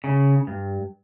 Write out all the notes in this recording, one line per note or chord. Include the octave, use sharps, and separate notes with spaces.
C#3
G2